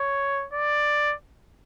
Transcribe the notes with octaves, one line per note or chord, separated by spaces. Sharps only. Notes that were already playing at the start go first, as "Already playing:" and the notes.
Already playing: C#5
D5